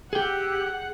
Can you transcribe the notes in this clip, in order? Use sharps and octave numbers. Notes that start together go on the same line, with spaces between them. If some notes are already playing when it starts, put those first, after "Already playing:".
G4 G#4 F#5 G5 E6